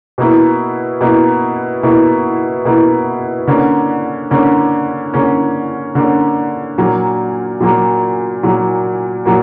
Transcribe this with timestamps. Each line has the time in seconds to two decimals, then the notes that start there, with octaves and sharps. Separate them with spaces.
0.18 B2 A#3 E4
1.01 B2 A#3 E4
1.83 B2 A#3 E4
2.65 B2 A#3 E4
3.47 D3 A#3 C#4
4.31 D3 A#3 C#4
5.14 D3 A#3 C#4
5.95 D3 A#3 C#4
6.78 A#2 F#3 A#3
7.60 A#2 F#3 A#3
8.43 A#2 F#3 A#3
9.26 A#2 F#3 A#3